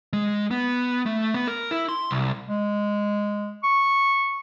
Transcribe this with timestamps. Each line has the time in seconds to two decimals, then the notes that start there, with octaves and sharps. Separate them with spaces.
0.13 G#3
0.51 B3
1.06 A3
1.34 B3
1.47 A#4
1.71 E4
1.89 C6
2.11 C2
2.49 G#3
3.63 C#6